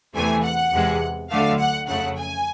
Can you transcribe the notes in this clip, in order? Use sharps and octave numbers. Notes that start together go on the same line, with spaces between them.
E2 C3 E3 A3 G#5
F#5
E2 C3 E3 G#3
D2 D3 F#3 A3 F5
F#5
F2 C#3 F#3 A3 F#5
G#5